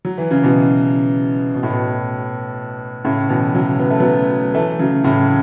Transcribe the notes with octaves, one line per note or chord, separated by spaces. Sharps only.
F#3
E3
C#3
B2 E3
B2
A2
B2
A2 C#3
B2 E3
C#3 F#3
B3
A3
F#3 B3
E3 A3
C#3 F#3
A2 C#3